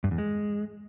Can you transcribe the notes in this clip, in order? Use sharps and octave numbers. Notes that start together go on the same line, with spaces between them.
G2
E2
G#3